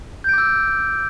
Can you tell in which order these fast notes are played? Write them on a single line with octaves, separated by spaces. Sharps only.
G6 D7 D6 E6